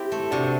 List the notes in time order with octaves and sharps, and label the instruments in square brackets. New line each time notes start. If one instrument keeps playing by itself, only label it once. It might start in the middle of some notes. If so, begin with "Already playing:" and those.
Already playing: [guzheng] C4 [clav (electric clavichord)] E4 G4
[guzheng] A3
[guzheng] C3 [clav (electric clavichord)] D4 F#4